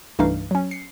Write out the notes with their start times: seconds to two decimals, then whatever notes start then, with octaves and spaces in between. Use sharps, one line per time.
0.19 C2 G2 E3 A3 D#4 F5
0.51 F#3 C#4
0.71 C7 C#7